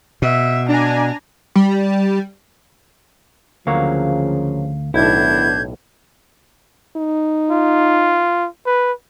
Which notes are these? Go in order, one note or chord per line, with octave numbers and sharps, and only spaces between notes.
B2 E5
D4 G#5 A#5
G3
D2 C#3 F3 F#3 A#3 C#5 F5
B1 A2 D#3 B3 D4 E4 G6 G#6
D#4
F4
B4